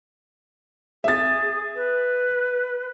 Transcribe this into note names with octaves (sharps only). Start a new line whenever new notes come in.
G#4 E5 A6
B4